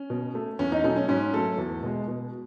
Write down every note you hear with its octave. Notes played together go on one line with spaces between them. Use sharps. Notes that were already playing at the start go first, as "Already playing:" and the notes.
Already playing: C#4
B2
A3
E2 C#4
D#4
B2 F#3 A3 C#4
C#4
G#2 C#4
F#3 A3 A4
E2
B2 G#3
B2